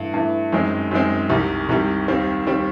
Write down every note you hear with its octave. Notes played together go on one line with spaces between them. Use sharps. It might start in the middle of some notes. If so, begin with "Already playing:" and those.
Already playing: G2 E3 A3
G2 E3 A3
F#2 D#3 G#3 C4
F#2 D#3 G#3 C4
C2 C3 D#3 G3
C2 C3 D#3 G3
D#2 D#3 G3 C4
D#2 D#3 G3 C4